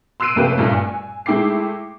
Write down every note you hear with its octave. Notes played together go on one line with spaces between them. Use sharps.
C6 E6 F#6 C7 D7 D#7
F1 F#2 A3 A#3 G4 B4
G2 A#2 G3 A3
G#5
G#3 A3 E4 G5 D6 C7